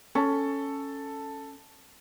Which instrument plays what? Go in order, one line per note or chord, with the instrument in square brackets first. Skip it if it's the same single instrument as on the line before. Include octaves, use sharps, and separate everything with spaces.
[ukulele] C#4 [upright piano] A4